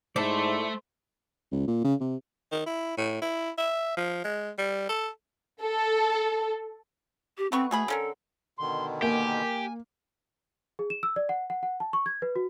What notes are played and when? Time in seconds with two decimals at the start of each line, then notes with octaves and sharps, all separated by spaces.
0.16 G#2 A3 E4 A4 C5 D5
1.52 C#2
1.68 A#2
1.84 C#3
2.01 C3
2.52 D#3
2.66 E4
2.97 A2
3.22 E4
3.58 E5
3.97 F3
4.24 G#3
4.58 G3
4.89 A4
5.61 A4
7.37 G4
7.52 A3 B3 C4 C#6
7.71 B2 A3 G#4 B5
7.88 D3 C#4 A4 A#4
8.58 B2 D3 D#3 C6
9.02 A#3 G4 G#5
10.79 G#4
10.90 E7
11.03 E6
11.16 D5
11.29 F#5
11.50 F#5
11.63 F#5
11.80 A5
11.93 C#6
12.06 G#6
12.22 B4
12.36 F#4